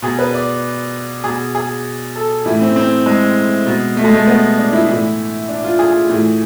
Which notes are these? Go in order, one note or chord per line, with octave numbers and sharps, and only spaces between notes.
B2 G#4
B4
D5
B2 G#4
G#4
A4
A2 E3 E4
C4
C4
G#3
B2
A3
G#3
A3
B3
D4
E4
A2 E3
D4
F4
G#4
A2 E3